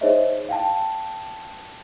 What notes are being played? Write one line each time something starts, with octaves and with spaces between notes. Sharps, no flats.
D#4 G#4 C5 C#5 D#5 E5
F5 G5 A5